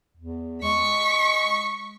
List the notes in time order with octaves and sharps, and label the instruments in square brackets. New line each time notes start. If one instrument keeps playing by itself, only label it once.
[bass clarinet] E2
[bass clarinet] G#3 [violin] C#6 B6